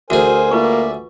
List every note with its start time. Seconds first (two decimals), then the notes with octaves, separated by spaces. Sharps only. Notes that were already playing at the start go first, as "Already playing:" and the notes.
0.10 D2 F#4 G#4 A#4 C5 E5 G#5
0.51 A#3 F4 B4 D5 E5 C#6